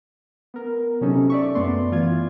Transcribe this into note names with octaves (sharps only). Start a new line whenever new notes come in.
B3 A#4
C3 F#3 C#4 D#4 A4
D5 E5 C#6
F#2 A3 B3 D5 C6
E3 F4 G#6